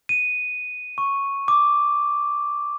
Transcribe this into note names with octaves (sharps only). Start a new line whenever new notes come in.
D#7
C#6
D6